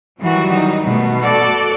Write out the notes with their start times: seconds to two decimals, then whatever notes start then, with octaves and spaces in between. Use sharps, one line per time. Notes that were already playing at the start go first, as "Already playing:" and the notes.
0.21 D#3 E3 F#3 G3 F#4
0.53 D#4
0.85 B2 A3
1.21 F#4 A4 D5